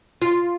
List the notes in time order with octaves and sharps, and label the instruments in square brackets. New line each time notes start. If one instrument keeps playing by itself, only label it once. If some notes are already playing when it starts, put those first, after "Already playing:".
[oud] F4